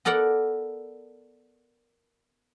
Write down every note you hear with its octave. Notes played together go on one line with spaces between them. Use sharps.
B3 A4 A#4 D5 F#5